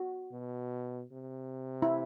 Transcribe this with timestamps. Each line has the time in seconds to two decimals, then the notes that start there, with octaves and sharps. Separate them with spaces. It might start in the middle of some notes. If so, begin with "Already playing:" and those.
Already playing: F#4
0.32 B2
1.12 C3
1.82 E4